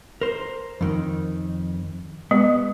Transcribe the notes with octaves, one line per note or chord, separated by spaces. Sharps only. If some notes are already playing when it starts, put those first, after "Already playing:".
A#4 C5
F2 D#3
G#3 B3